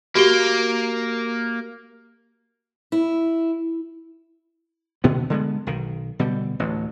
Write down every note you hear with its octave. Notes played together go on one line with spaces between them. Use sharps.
A#3 F#4 G4 G7
E4
B2 D3 D#3 B3
D3 G#3 B3
B1 D#3
B2 D3 G3
A1 D2